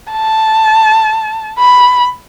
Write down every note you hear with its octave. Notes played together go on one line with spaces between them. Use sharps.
A5
B5